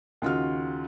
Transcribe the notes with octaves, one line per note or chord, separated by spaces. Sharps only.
D#2 C#3 F4 F#4 F6